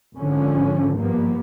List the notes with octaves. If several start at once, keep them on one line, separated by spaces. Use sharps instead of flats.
G#1 D3 F3 C#4
G2 F3 A#3 B3